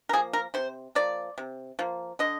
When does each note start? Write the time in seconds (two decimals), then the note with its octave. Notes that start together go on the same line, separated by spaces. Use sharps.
0.09 A#4
0.13 F3 A#3 G#4
0.33 A#4
0.54 C3 C5
0.95 F3 A#3 D5
1.38 C3
1.79 F3 A#3
2.19 D3 D#5